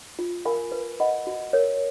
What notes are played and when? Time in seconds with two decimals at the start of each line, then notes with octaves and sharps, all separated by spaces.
0.19 F4
0.45 A#4 F5 G#5 B5
0.72 B4
1.00 D#5 F#5 B5
1.27 F#4
1.53 A#4 C#5